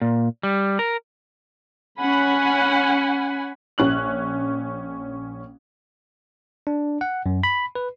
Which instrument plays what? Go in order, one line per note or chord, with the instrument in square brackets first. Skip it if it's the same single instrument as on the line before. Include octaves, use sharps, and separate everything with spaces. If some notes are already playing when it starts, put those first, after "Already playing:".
[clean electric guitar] A#2
G3
A#4
[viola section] C#4 F#5 G#5 B5
[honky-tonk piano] A#1 C#4 F#6 F#7
[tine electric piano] D4
F#5
F#2
B5
B4